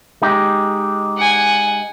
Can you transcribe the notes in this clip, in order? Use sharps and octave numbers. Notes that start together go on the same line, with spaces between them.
G#3 D#4 G4
F#5 G#5